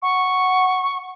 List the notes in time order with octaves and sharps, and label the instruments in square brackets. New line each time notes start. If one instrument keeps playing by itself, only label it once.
[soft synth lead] F#5 [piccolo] C#6